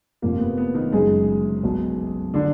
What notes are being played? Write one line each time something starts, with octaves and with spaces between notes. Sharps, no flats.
F1 F2 F3 A#3
B3
B3
D#3 D#4
F#1 F#2 D#3 F#3 G#3 G#4
B1 B2 F#3
D3 D#3 F#3 D4